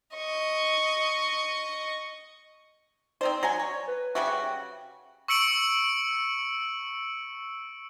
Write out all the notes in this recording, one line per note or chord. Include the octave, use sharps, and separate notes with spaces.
D#5 C#6
C4 D#4 C5 D5
F#3 G#5
C#5
B4
C#3 G3 F#4 E5
G5
C#6 E6 C#7 D7 F#7